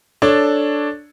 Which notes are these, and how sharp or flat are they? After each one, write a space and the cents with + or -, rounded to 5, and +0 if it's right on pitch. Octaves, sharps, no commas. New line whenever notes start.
D4 +0 A4 +0 C#5 +0